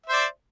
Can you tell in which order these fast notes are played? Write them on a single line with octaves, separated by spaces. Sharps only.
E5 C5 D5